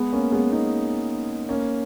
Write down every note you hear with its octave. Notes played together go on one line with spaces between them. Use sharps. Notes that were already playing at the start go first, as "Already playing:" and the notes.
Already playing: G#3 B3
A#3 C#4
G#3 B3
B3 D#4
A#3 C#4